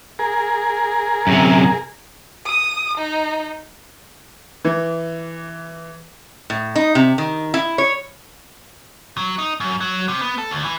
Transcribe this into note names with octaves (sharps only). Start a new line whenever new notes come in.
G#4 A#4
F#2 C3
D#6
D#4
E3
A2
D#4
C3
D#3
E4
C#5
F#3
D#4
F#2
F#3
C3
B3
A4
D2
E3